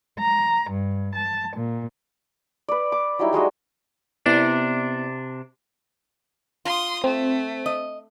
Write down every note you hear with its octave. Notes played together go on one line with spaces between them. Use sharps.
A#5
G2
A5
A#2
B4 D5
D6
F#3 G3 D#4 E4
G3 G#3 F#4 D#5
C3 B3 D4 E4 D5
F4 C6 D#6
A3 C4
D#5